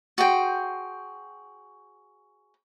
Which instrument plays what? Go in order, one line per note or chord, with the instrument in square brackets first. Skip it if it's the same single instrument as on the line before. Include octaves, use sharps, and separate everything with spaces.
[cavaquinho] F#4 G#4 C5 G5